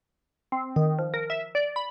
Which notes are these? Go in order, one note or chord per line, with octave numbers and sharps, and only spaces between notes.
C4
D#3
F3
A#4
E5
D5
B5